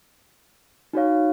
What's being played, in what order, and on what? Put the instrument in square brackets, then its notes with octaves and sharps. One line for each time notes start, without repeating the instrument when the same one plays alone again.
[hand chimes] D#4 F#4 C#5 F5